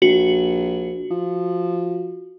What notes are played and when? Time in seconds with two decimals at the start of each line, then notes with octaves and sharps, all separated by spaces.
0.02 A#1 F#4
1.11 F3